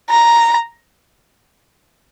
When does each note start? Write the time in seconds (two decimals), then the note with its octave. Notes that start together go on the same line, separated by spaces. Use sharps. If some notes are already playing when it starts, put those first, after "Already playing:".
0.10 A#5